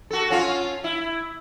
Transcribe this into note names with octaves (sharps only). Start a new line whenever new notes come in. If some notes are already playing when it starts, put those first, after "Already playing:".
F#4 A4
C#4 F4
E4